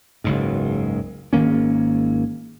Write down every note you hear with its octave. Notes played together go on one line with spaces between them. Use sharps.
F#1 C#2 G#2
G#1 D#3 A#3 C#4